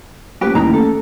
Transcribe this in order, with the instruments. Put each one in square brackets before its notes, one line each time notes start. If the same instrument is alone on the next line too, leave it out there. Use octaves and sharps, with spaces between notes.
[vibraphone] A3 A#3 C#4 [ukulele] G4 B4
[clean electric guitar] E2 D#3 E3 [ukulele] A#5
[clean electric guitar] A4